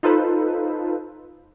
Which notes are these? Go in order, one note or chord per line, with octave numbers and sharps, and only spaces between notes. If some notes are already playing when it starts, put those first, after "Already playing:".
D#4 F4 A4 B4 C5